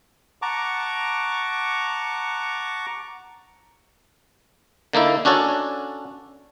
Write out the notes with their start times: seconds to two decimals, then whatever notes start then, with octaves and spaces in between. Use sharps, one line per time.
0.42 F#5 A5 A#5 C#6 D6
4.93 D3 A#3 D#4 E4
5.25 C#4 D4 F#4 A4 C#5